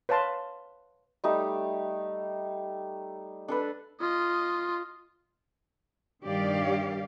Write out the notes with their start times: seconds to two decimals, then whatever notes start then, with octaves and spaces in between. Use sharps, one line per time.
0.09 B4 C#5 F5 A5 C6
1.24 G3 A3 D#4 G4
3.48 D4 A4 B4
4.01 F4 D#5
6.23 G2 D#3 G3 G4 D5 F5